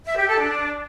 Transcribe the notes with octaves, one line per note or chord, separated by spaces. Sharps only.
E5
G4
A4
D4